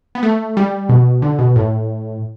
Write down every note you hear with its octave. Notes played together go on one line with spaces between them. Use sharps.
B3
A3
G3
B2
D3
B2
A2